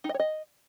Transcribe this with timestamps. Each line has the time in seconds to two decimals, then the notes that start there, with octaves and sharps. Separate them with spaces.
0.04 D#4
0.09 D#5
0.14 C#5
0.19 D#5